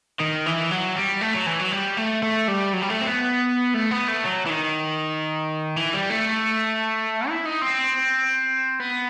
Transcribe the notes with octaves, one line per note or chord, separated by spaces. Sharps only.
D#3
E3
F#3
G3
A3
F#3
E3
F#3
G3
A3
A3
G3
F#3
G3
A3
C4
B3
A3
B3
A3
F#3
E3
D#3
E3
G3
A3
E4
D#4
C4
B3